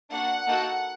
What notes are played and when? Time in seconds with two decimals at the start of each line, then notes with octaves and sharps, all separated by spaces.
0.10 A#3 D4 F#4 F#5
0.47 A#3 D#4 F#4 A4